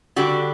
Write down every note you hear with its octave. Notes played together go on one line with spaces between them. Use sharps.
D3 G3 F#4